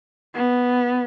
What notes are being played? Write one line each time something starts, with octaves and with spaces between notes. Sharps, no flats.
B3